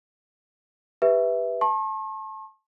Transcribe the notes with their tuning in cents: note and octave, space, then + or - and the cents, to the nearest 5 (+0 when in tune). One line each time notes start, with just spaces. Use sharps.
G4 +15 B4 +0 E5 +0
A5 -5 C#6 -45